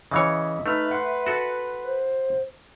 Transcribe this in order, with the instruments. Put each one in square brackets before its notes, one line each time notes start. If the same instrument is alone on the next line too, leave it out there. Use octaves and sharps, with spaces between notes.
[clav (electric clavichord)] C#3 E3 C#5 [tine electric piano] D#5 [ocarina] E5
[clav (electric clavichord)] A3 [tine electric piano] D#4 F6 [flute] B4
[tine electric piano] F#5 C6
[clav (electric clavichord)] F#4 A4
[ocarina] C5